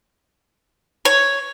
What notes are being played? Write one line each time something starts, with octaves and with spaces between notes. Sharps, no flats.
C#5